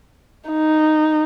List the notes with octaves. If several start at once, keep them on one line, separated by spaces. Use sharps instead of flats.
D#4